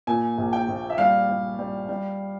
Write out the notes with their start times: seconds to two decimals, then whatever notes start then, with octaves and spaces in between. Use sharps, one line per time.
0.07 A#2 G#5
0.38 A#1
0.53 G5
0.68 A#1
0.90 E5
0.98 G3 F5
1.29 G3
1.59 G3
1.89 G3